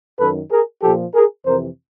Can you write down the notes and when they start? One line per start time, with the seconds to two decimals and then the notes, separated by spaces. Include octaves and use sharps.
0.19 F#2 D#3 A4 B4
0.51 G#4 A#4
0.82 A#2 F3 G4 A4
1.14 G#4 A#4
1.46 F2 C3 E3 A#4 C5